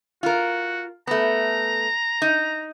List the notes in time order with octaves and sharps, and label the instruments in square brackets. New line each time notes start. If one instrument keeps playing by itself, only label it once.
[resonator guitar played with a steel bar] F4 A#4 [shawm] F#4
[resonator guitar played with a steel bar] A3 B3 [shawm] A#5
[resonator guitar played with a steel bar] D#4